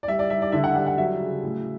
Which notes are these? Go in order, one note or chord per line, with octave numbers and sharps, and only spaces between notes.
D5
G3 E5
D5
G3 E5
D5
D3 E5
F#5
G3 F#5
F#5
F#3 E5
C#3
A2